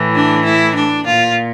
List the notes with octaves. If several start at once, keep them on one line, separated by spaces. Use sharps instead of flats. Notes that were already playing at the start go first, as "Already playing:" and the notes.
Already playing: A2 E3
D4
E4
D4
A#2 F4